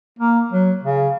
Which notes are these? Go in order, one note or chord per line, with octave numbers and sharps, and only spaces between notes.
A#3
F#3
C#3